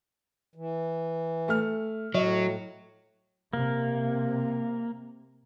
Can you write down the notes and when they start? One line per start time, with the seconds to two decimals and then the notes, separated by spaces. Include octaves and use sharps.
0.55 E3
1.48 A3 F6
2.14 A2 F#3 D#5
3.53 C3 A#3